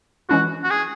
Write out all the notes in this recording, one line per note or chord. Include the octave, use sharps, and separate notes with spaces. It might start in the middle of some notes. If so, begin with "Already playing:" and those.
E3 G#3 C#4 E4 F#4
F#4
G#4